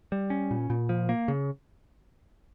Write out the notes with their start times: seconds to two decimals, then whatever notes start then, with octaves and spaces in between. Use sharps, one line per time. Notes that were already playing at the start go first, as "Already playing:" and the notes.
0.12 G3
0.30 C#4
0.51 A#2
0.70 A#2
0.89 F3
1.09 A#3
1.28 C#3